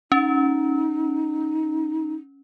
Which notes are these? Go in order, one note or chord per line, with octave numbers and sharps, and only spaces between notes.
C#4 D#4